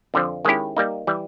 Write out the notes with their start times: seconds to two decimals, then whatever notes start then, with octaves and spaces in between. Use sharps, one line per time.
0.14 F2 D3 F3
0.45 D#3 G#3 C#4 E4 G4
0.77 G3 A#3 D#4
1.07 E3 G3